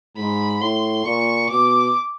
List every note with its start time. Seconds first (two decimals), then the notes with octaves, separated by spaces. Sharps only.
0.17 G#2 B5
0.61 A2 C6
1.05 A#2 C#6
1.49 B2 D6